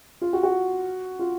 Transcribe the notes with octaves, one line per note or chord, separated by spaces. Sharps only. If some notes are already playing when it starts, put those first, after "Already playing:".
F4
F#4
F#4
F4